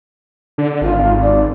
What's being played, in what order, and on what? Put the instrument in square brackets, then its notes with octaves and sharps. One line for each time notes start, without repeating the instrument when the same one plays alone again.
[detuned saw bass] D3
[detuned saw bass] G#1 [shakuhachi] F4
[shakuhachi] D5